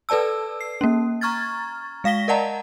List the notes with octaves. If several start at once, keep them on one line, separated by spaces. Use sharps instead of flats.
A4 B4 D5 A5 E6
C7
A#3 C#4
A#5 C#6 F6 G#6 A6
G#3 F5 A#6 B6 G7
A#4 D5 D#5 F#5 A5 A#5